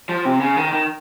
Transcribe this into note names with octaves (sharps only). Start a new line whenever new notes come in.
F3
C3
C#3
D#3
D#3